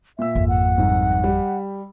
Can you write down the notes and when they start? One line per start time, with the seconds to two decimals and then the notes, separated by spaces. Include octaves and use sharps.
0.19 A#2 E5 E6
0.35 G#1 F2
0.49 F#5
0.78 C2 G#2
1.24 G3 G4